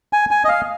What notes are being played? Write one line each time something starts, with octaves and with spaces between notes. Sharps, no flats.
G#5
G#5
D#5
F5